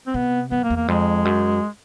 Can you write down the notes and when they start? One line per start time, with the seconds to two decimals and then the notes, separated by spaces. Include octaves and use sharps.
0.07 C4
0.14 C3 B3
0.51 F#2 B3
0.63 A#3
0.70 E2
0.76 A#3
0.88 F2 G#3
1.25 F#2